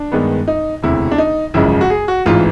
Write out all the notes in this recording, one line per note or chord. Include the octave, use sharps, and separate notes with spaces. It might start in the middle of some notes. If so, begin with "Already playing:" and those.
Already playing: D4
G2 D#3 G#3 B3
D#4
E1 D2 C3 E4
D4
D#4
G#1 F#2 C#3 F3 G#3 E4
F#4
G#4
F#4
A1 G#2 E3 F4